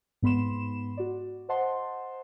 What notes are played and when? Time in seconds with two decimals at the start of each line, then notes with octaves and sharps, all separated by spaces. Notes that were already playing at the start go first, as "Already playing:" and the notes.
0.22 G#2 B3 B5 C6 E7
0.97 F#4 D5
1.49 C5 D#5 F#5 A5 C6